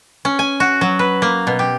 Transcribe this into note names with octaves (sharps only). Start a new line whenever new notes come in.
C#4
G#5
F#4
F#3
B4
A#3
B2
G4